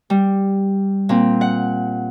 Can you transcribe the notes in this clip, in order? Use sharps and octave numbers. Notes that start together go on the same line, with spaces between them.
G3
A#2 C4
F#5